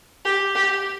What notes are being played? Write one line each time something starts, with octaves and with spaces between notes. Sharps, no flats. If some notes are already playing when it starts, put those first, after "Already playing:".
G4
G4